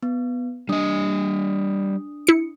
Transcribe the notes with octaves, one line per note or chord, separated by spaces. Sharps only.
B3
G3 D4 D#5 D#6
E4 C#7